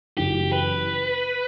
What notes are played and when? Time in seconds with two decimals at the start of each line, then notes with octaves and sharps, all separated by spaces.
0.17 F#1 F#2 C#3 E3 G4
0.53 B4